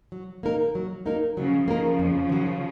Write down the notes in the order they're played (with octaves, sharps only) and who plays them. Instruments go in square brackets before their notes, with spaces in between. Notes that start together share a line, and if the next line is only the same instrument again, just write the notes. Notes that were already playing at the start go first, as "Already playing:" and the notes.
[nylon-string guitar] F#3
A#3 D#4 A#4
F#3
A#3 D#4 A#4
[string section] C#3 F3 [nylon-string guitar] F#3
[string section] C#3 F3 [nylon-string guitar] A#3 D#4 A#4
[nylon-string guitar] F2
D#3 F#3